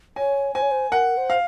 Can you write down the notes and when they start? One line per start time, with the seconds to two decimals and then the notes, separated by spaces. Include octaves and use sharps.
0.16 C#5 G#5
0.55 C5 G#5
0.62 C#5
0.71 C5
0.91 A#4 F#5
1.17 C5
1.30 F5